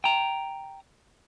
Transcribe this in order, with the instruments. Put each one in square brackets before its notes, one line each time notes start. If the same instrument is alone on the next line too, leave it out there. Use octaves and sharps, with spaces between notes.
[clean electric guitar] G5 A#5